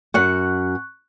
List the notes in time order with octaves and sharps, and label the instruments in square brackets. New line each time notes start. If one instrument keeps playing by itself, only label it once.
[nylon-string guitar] F#2 F#4 F#5 [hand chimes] C#6 F#6